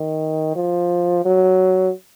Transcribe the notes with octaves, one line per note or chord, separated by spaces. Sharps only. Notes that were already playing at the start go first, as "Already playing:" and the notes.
Already playing: D#3
F3
F#3